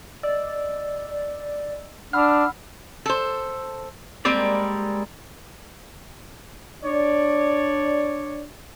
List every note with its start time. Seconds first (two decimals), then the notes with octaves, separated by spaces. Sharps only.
0.23 D5 D#5 E6
2.13 D4 F#5 B5 E6 F6
3.06 A4 C5
4.25 G3 G#3 A#3 C4 A#4 D5
6.84 D4 C#5 D5